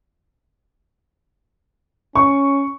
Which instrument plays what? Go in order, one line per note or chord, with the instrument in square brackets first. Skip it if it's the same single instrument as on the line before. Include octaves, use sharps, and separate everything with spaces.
[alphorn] C#4 [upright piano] C#6